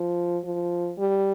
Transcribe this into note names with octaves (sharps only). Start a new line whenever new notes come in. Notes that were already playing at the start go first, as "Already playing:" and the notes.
Already playing: F3
F3
G3